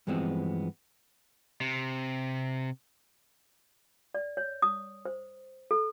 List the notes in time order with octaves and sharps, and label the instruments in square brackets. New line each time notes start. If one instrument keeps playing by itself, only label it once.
[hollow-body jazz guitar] G2 E3 F3 G#3 B3 C4
[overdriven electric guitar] C3
[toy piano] D5
C#5
D#6
C5
A4